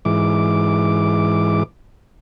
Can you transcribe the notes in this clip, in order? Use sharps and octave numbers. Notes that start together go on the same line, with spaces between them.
G#2 E3 D6